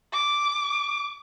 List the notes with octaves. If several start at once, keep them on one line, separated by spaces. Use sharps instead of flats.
D6